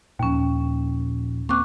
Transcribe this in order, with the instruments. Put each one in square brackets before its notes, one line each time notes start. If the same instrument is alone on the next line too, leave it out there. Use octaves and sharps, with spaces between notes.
[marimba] D#2 C#4 [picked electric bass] A#2 F3
[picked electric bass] A#3 C4 [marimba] C#6 D6 F#6